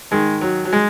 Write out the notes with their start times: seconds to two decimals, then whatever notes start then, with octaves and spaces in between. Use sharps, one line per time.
0.11 G#2 D#3 G#3
0.41 F#3
0.65 F#3
0.73 G#3